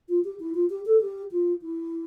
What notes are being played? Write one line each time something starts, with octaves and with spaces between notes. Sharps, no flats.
F4
G4
E4
F4
G4
A4
G4
F4
E4